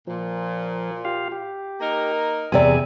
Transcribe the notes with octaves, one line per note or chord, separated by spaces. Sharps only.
A#2 F3
F4 G4 F5
G4
A#3 D#4 A#4
E2 C3 E3 G#4 D5 G#5